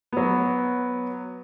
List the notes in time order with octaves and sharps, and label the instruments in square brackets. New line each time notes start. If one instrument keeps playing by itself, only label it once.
[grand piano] F#3 B3